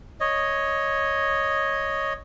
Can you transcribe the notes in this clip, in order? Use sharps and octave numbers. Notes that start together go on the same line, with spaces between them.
C#5 D#5